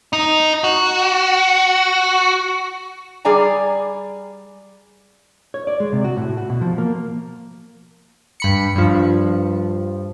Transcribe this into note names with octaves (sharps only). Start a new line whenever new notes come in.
D#4
F#4
G3 G#4 D5 G#5 A#5
C#5
D5
G#3
C3
F#4
A2
F#4
B2
F3
A#3
G2 B5 C#7
G2 F3